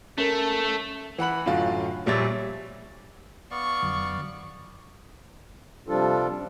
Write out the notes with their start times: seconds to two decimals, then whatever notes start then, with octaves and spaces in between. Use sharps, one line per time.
0.18 A3 C#4 A#4
1.18 E3 F#5 B5 F#7
1.46 F#2 A2 D3 F#3 F4
2.06 A#1 A#2 G3 C#5 E5 A6
3.51 B3 D5 F5 C#6
3.83 F2 D3 F#3
5.88 C3 F3 G3 D4 F4 A4
6.32 F#2